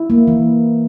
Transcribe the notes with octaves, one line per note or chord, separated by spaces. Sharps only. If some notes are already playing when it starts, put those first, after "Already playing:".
Already playing: E4
A#3
E3